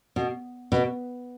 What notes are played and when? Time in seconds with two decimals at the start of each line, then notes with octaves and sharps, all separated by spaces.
0.16 B2
0.72 B2